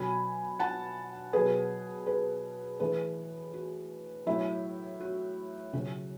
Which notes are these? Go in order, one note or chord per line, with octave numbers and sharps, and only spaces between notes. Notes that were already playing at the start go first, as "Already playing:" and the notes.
Already playing: B2 F#3 G#5 B5
F#5 A5
B2 F#3 G#4 B4
G#4 B4
A2 E3 G#4 B4
F#4
A2 F#3 E4
F#4
C#3 F#3 F#4